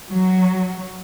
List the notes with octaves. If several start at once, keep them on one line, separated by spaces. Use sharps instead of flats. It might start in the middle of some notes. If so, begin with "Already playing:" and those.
F#3